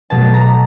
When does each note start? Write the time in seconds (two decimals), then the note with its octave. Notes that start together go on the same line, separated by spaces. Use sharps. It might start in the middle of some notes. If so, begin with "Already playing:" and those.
0.10 B2 F#3 A3 A5
0.34 A#5